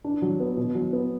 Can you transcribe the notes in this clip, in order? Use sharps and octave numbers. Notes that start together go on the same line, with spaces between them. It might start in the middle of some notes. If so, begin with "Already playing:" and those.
D4
F#3
B3
B2
F#3
B3